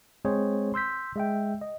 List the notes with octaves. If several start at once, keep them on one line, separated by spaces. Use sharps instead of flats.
G#3 C4 G#4 C5 C#5
C6 E6 G6 B6
G#3 E5 G5
D#5